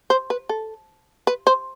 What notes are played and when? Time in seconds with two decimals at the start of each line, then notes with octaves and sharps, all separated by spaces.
0.10 C5
0.30 B4
0.49 A4
1.27 B4
1.47 C5